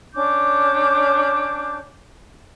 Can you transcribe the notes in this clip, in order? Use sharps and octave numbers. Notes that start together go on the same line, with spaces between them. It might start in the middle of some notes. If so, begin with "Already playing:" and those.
C#4 D4 D6 G6